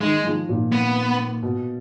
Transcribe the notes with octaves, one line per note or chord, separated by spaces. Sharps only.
D#3 G#3
F3
A#2
B3
B2